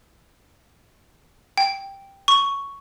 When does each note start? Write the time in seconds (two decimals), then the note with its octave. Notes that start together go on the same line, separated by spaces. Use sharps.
1.58 G5
2.28 C#6